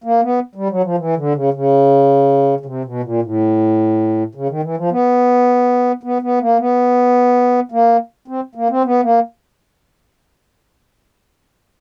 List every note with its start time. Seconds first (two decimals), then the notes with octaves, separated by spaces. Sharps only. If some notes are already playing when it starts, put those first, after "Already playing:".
0.04 A#3
0.23 B3
0.55 G3
0.70 F#3
0.83 F3
0.98 E3
1.16 D3
1.35 C#3
1.54 C#3
2.60 C#3
2.66 C3
2.85 B2
3.03 A#2
3.22 A2
4.35 C#3
4.49 D#3
4.63 E3
4.77 F3
4.91 B3
6.03 B3
6.22 B3
6.41 A#3
6.59 B3
7.72 A#3
8.28 C4
8.55 A#3
8.70 C4
8.84 B3
9.03 A#3